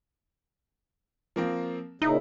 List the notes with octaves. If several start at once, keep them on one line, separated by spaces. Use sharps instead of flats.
F3 A#3 C4
A#2 C#3 D#4 E4